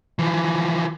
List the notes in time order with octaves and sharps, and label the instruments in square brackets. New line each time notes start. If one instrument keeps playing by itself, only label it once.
[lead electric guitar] E3 F3